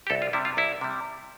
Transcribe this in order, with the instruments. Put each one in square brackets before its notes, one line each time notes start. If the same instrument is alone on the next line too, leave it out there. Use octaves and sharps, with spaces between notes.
[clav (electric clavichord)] G4
C2 A4
F4
C3 G3 E4
F4
C2 E4
C3 G3